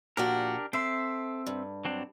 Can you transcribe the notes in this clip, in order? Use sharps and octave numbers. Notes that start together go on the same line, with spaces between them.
A#2 F3 D4 F#4 G4 A#4
C4 A4 E5 C6
G2
F#3 C4 D4